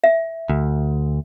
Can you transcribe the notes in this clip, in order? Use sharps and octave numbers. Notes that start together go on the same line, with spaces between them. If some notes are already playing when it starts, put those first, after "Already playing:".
E5
D2